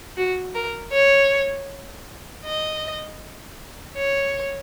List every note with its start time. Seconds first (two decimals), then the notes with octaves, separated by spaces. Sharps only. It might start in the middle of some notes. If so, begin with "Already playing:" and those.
0.17 F#4
0.55 A#4
0.93 C#5
2.45 D#5
3.97 C#5